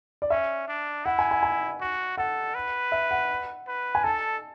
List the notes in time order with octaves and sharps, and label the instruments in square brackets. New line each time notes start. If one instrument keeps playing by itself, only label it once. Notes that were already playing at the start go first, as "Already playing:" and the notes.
[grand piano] D5
[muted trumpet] C#4 [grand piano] E5
[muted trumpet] D4
[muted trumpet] E4 [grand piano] F#5
[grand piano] G#5
G#5
G#5
[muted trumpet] F#4
[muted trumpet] A4 [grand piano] F#5
[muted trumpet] B4
[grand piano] E5
F#5
[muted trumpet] B4
[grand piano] G#5
[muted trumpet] A4 [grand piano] A5